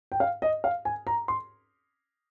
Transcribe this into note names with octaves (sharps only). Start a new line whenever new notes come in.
G5
F5
D#5
F5
G#5
A#5
C6